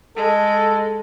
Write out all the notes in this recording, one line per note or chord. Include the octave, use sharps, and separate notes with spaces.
G#3 A4